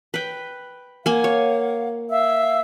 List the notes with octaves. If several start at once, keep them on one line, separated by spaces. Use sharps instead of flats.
B4 G5
A#3 F5 F#5 G#5
C#5
E5 F5 E6